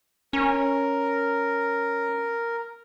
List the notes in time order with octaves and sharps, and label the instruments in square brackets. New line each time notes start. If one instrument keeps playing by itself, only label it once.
[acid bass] C#4 [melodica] A#4